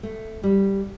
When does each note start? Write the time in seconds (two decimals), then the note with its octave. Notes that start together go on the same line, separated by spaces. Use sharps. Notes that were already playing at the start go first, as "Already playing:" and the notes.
0.03 A3
0.44 G3